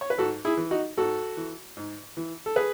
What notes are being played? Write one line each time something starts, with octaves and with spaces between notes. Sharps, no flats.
C#5
B4
G#2 F#4 A4
E4 G#4
E3
D#4 F#4
G#2 F#4 A4
E3
G#2
E3
A4
G#4 B4